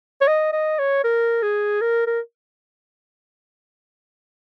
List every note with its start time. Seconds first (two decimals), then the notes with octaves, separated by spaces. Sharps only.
0.21 C#5
0.28 D#5
0.53 D#5
0.79 C#5
1.04 A#4
1.42 G#4
1.81 A#4
2.07 A#4